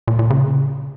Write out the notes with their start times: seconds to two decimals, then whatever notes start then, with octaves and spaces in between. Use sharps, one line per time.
0.08 A#2
0.19 A#2
0.30 C#3